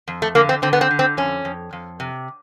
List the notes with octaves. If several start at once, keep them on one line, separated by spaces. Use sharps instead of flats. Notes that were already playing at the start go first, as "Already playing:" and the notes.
F2
A3
D3 A#3
C4
D3 C4
B3
C4
D3
C4
F2 C#4
F2
F2
C3